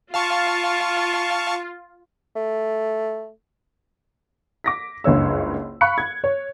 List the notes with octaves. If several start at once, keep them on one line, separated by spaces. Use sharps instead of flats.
F4 F5 A5 C#6
A3
D6 A#6 B6
F#1 C#2 G2 C#5 E6
F5 B5 C#6 F#6 C#7
G#6
C#5